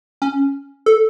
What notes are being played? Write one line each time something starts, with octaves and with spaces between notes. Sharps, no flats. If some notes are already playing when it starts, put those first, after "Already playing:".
C#4
A4